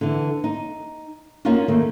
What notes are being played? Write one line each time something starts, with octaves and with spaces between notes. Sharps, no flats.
D3 E3
D#4
A#3 C#4 D#4 F4 F#4
D#2 D#3 A3 A#3